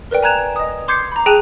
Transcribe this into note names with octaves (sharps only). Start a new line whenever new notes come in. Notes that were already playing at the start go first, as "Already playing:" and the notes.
A#4 B4 D5 G5
G#5 A#5 F#6 G#6 E7 F7
D#5 D#6
C6 D6 G6 G#6 C7 C#7
A#5 B5
G#4 G5 A5 F#6 D#7 F7